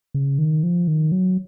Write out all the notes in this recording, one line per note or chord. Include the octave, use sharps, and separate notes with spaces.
C#3
D#3
F3
D#3
F#3